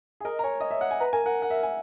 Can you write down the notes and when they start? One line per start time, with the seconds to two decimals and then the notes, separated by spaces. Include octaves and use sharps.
0.20 G#4
0.24 A#4 D#5
0.39 A#5
0.44 C#5 G#5
0.60 D#5
0.71 E5
0.81 F#5
0.91 G#5
1.00 B4 A#5
1.13 A#4 G#5
1.25 A#4 F#5
1.42 F#5
1.51 E5
1.63 G#5